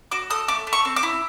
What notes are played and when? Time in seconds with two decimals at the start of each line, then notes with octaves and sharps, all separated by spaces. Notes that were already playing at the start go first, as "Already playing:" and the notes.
0.11 F#4 D6
0.30 A4 D#6
0.48 A3 D6
0.67 A3
0.73 C#6
0.85 C4
0.96 D6
1.03 E4